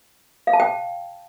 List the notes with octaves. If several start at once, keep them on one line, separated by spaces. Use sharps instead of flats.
F5
A5
G5